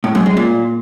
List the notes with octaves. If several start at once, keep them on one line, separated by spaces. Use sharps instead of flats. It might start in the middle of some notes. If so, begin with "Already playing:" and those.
A2
F#2
G#3
A#2